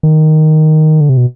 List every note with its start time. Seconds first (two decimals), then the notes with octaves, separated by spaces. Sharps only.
0.03 D#3
1.01 D3
1.09 C3
1.17 B2